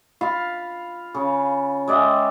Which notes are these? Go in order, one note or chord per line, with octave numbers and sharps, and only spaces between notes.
F4 F5 B5
C#3
G#3 D5 E5 G5